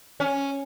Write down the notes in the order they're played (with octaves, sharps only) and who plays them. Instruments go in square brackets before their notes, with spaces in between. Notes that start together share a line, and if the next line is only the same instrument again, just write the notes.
[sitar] C#4